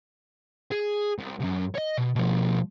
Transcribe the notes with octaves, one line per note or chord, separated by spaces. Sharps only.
G#4
C2
C2 F#2
C#5 D#5
B2
B2 F3